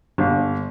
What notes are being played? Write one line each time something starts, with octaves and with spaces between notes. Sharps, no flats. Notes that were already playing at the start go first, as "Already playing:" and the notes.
G1